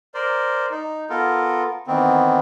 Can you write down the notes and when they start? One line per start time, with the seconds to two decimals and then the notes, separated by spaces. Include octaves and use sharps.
0.14 A#4 C5 D5
0.71 D#4
1.10 B3 F4 A4 A#4
1.87 D#3 E3 B3 C4